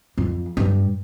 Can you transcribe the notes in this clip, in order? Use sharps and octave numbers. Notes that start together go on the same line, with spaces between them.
F2
G2